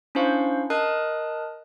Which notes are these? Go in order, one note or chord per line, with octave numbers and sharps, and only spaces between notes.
C#4 D4 E4 C5 F5 C#6
A#4 D#5 A5 D#6 F#6